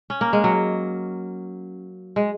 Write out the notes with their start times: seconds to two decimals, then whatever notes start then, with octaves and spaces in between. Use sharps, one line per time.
0.10 C#4
0.21 A#3
0.33 G#3
0.44 F#3
2.16 G#3